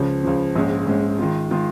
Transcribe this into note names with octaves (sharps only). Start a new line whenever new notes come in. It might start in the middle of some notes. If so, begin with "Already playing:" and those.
Already playing: C#2 C#3 F3
C#2 C#3 F3
A#1 G#2 G#3 C#4
A#1 G#2 G#3 C#4
D#3 G#3 F4
D#3 G#3 F4